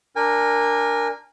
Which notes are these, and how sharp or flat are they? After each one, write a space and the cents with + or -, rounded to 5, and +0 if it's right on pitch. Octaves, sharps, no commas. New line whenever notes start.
D4 +0 A#4 +0 G#5 -30